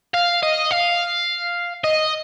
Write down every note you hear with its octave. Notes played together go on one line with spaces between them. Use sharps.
F5
D#5
F5
D#5